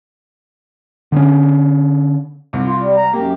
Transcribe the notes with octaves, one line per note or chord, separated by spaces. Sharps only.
D3 B3 C#4
C2 C3
F4
G3
A#5
F#2 A#3 G4